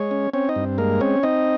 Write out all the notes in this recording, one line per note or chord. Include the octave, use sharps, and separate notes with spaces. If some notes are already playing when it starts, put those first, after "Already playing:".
Already playing: G#3 C#5
C#4
C4 C#4 C#5
D#4 D#5
G2
G#3 A#3 A#4
C4 C#4 C#5
C4 D#4 D#5